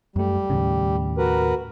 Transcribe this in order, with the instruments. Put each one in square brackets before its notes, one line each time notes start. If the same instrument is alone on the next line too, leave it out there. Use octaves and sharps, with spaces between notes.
[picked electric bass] F#2 A3 [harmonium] G3
[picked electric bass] D#2 A2 C#3
[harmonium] F#4 A#4 B4